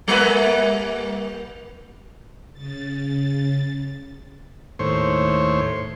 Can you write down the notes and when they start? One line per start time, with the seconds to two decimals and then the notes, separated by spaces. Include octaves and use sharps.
0.08 G3 A#3 B4
2.53 C#3 A6
4.79 D#2 A2 C5 C#5